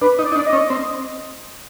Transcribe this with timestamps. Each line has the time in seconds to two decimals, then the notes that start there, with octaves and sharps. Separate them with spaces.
0.01 D4 B4
0.19 D#4
0.24 D5
0.32 D#4
0.36 D4 D5
0.47 D#5
0.53 C#4
0.70 C4